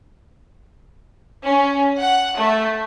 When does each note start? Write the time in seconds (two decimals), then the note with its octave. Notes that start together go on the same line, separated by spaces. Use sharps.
1.46 C#4
1.98 F#5
2.36 A3